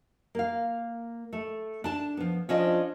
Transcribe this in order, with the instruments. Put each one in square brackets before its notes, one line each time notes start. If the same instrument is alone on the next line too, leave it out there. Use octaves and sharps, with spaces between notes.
[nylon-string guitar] A#3 F5
A3
D4 A5
F3 B3
[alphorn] F3 [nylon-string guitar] C#4 D4 D#5